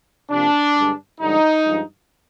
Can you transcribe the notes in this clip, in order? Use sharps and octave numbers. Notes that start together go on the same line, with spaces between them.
C3 F3 A#3 D4
G2 D3 G#3
G2 D3 F3 G#3 D#4
G2 F3 G#3